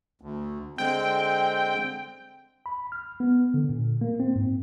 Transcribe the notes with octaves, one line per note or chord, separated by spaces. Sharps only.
D2
D3 G#3 C4 G5
B5
F6
B3
D3
A#2
A#3
C4
G#2